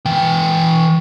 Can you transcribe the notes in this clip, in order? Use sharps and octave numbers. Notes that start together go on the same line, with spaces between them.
E3 G5